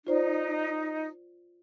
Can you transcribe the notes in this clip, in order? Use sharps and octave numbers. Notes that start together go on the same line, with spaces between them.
D#4 F4 C5 D5